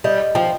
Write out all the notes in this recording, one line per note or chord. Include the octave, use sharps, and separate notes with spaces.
G3 D#5
F3 G5